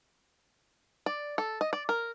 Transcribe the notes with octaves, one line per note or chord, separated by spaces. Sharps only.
D5
A4
D#5
D5
A#4